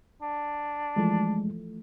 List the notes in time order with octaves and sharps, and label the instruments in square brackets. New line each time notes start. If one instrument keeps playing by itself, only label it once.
[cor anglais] D4
[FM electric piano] E3 F3 A3 [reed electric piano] G#3